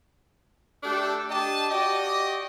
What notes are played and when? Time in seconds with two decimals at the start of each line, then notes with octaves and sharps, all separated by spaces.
0.83 A3 D4 G4 A4
1.29 D4 G4 D#5 A5
1.70 F#4 G4 D5 D#5